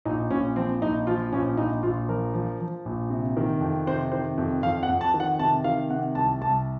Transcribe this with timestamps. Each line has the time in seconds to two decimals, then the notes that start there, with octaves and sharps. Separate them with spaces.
0.05 A#1 D#4
0.30 A#1 C#4
0.56 F3 C4
0.82 A#1 D#4
1.07 F3 F4
1.32 A#1 C#4
1.57 A#1 D#4
1.83 A#1 F4
2.08 F3 A#4
2.34 F3
2.60 F3
2.85 A#1
3.10 C3
3.37 D#3
3.61 F2
3.87 C3 C5
4.12 D#3 C5
4.38 F2
4.63 F2 F5
4.83 F#5
4.89 F2
5.01 A5
5.14 D#3
5.20 F#5
5.39 C3 A5
5.64 D#3 F5
5.90 C3 F#5
6.15 C2 A5
6.41 C2 A5